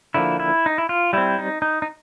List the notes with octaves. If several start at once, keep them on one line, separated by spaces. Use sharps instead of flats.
D3 F3 A#3 E4
E4
D#4
E4
F4
G3 C4 E4
D#4
D#4
D#4